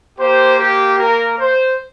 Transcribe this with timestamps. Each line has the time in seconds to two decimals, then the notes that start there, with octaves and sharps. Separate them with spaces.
0.18 A#3 G4 C5
0.58 G4
0.98 A#4
1.38 C5